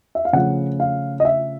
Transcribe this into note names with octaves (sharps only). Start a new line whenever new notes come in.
E5
F5
C#3 F3 A3 F#5
F5
D#5
E5